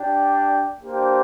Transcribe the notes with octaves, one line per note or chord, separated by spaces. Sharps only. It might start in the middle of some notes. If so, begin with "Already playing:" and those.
Already playing: D4 G4 D5 G5
A#3 D4 G4 C5 G5